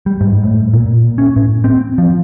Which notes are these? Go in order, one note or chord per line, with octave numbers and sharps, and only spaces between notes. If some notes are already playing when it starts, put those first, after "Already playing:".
G3
G#2
A2
A#2
C#4
A2
C4
F3